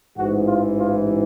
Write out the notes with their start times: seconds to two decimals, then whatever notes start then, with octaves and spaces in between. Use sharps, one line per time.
0.17 A1 G#2 E3 F#4
0.47 F4
0.79 F4